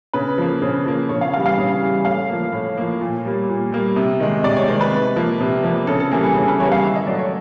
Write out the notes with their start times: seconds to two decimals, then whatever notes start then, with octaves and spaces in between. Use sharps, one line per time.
0.13 C#3 B4
0.38 F3 A#3
0.62 C#3 C5
0.86 F3 A#3
1.09 C#3 C#5
1.21 F5
1.33 E3 F5
1.37 G3
1.46 F5
1.58 C#3
1.82 E3 G3
2.05 A2 F5
2.29 F3 A#3
2.52 A2
2.77 F3 A#3
3.01 A#2
3.25 G3 A#3
3.49 A#2
3.72 G3 A#3
3.96 C3
4.20 D#3 G#3
4.44 C3 D5
4.56 C#5
4.68 D#3 G#3 C5
4.81 B4
4.92 C3
5.16 F3 A#3
5.40 C3
5.64 F3 A#3
5.87 C#3 A4
6.00 A4
6.11 E3 G3 A#3 G#4
6.23 G#4
6.35 C#3 A4
6.48 B4
6.60 E3 G3 A#3 C#5
6.72 F5
6.84 D#3 E5
6.96 D#5
7.07 F#3 A3 D5
7.19 C#5